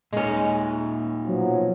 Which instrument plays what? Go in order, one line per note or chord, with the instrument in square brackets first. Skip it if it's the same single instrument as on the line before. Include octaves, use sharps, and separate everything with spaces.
[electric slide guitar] A#2 D#4 [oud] G#3 C#4
[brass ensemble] B2 F3 F#3